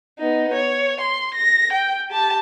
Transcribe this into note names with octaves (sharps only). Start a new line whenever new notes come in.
B3 D#4
C#5
C6
A#6
G5
G4 A5